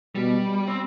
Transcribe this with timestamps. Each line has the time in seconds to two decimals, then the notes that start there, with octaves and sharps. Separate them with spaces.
0.15 B2 G3
0.68 C4